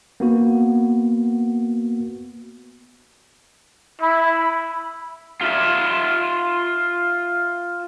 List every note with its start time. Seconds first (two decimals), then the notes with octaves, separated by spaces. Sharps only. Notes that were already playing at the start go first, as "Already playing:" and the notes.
0.20 A#3 B3 F#4
4.01 E4 B5
5.41 F4 E5